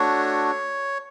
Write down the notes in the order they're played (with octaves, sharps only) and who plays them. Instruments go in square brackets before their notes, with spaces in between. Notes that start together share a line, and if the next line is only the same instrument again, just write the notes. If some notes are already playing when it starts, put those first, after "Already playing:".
Already playing: [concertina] A3 D4 F#4 C#5